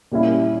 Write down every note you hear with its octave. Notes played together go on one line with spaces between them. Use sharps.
A#2 G3 C#4 E4